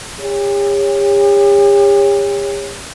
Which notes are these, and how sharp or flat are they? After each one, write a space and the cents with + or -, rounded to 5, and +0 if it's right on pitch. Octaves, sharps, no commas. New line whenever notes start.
G4 +45 C#5 +0